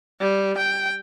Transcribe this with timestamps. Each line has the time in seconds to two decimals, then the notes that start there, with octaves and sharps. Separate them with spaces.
0.21 G3
0.58 G5